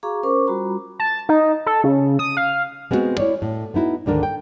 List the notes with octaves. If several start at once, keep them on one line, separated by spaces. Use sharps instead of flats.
F#4 G#4 F5 A#5 C#6 D6
C#4 A#4 C5 C#6 D6
G3 F4 F#4 A#5 B5
A5
D#4
A4
C#3
D#6
F5
G#3 B3 C4 D4 F#4
E4 C#5 D5
A2
B3 D#4 E4 F#4
D2 G#2 D3 D#3 D4 A#4
G5